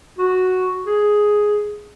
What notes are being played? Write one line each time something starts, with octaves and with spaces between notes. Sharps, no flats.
F#4
G#4